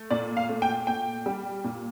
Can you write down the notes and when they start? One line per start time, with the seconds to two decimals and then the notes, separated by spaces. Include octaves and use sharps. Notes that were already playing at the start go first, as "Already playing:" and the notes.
Already playing: A3
0.11 A#2 D5
0.37 F5
0.49 A3
0.62 G5
0.87 A#2 G5
1.26 G3
1.64 A#2